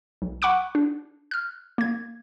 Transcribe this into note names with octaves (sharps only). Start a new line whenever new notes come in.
B1
F#5 B5 C#6 D6 F#6 D7
D4
F6 F#6
A#3 G#6